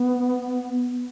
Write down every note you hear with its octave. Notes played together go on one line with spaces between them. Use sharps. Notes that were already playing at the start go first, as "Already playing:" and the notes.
Already playing: B3